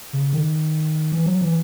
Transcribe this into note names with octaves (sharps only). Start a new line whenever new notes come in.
C#3
D#3
E3
F#3
E3